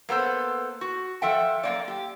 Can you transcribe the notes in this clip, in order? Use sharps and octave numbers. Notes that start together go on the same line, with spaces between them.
A#3 B3 A4 C5
F#4
F3 A4 E5 F#5 G5
F#2 A#3 D5
G4